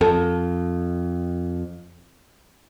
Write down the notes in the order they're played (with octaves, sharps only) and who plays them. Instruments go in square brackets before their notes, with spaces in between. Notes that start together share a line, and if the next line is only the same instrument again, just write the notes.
[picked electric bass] F2 [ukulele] A4